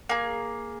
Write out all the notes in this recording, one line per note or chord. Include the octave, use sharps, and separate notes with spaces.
A#3 G#4